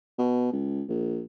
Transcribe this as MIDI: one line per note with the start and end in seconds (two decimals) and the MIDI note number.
0.18 0.50 47
0.53 0.83 37
0.89 1.22 34